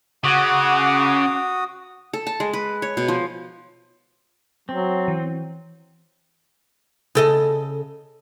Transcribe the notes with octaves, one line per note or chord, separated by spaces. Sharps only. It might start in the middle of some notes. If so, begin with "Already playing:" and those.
C#3 F#4 F#5 D6 D#6
A4
A5
G#3
B4
C#5
B2
F3
F#3 C4
E3
C#3 A4 D#5